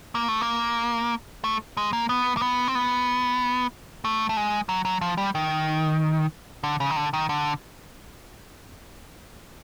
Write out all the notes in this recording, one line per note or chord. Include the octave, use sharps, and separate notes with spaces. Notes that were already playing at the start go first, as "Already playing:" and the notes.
A#3
A3
A#3
A3
G#3
A#3
B3
A#3
B3
C4
B3
A3
A3
G#3
F#3
F#3
F3
G3
D#3
D3
C#3
D#3
D3
D#3
D3